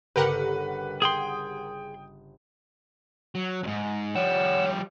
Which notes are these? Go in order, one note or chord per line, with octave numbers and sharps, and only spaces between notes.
G1 C#3 G4 A#4 B4 F#5 C#7
G#4 G5 C6 D#6
F#3
F2 G#2
F3 G3 C#5 F#5 E6